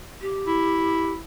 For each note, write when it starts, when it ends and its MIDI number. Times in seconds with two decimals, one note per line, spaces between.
0.21 1.13 67
0.47 1.21 64